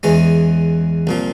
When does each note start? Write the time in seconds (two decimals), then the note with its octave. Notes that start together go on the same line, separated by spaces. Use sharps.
0.03 E2 E3 G#3 C#4
1.07 C2 A#2 F3